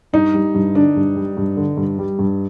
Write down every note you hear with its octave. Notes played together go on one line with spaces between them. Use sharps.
G2 D#4
G3
G2
D3 D4
G2
G3
G2
D3
G2
G3
G2